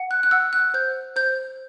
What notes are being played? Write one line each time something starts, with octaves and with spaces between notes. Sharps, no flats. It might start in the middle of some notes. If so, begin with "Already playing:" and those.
Already playing: F#5
F#6
F#6
F#5 E6
F#6
C5 G6
C5 G6